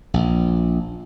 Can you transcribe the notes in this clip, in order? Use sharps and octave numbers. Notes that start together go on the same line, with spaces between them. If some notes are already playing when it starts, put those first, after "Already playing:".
A#1